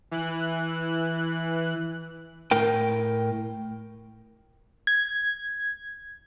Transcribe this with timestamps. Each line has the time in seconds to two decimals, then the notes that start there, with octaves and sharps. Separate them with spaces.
0.11 E3 F#6
2.51 A2 A#4 G5
4.87 G#6